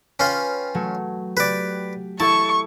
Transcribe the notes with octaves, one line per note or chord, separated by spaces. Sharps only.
C#4 F4 B4 G5
F#3 A3
G4 B4 D5
E4 A4 E5 A5 C#6